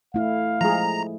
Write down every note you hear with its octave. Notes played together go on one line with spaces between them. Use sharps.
A3 E4 F5
F3 G#3 G#4 A#5